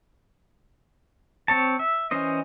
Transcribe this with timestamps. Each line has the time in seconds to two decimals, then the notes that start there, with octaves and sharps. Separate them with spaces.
1.48 C4 C#5 A5
1.79 E5
2.11 E3 C#4 C5 D#5